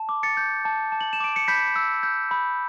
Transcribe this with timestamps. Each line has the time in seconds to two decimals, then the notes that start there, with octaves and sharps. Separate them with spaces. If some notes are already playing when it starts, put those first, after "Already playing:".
Already playing: A5
0.09 D6
0.23 A6 C#7
0.37 G6
0.65 A5
0.92 A5
1.01 F#7
1.13 E7
1.20 D6 D7
1.36 C#7
1.48 B5 G6 B6
1.76 E6
2.03 G6
2.31 B5